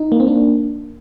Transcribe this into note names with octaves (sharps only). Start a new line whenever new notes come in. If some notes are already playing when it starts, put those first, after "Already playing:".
Already playing: D#4
A#3
C4
A#3 D4